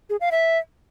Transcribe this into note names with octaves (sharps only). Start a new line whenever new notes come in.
G#4
F5
E5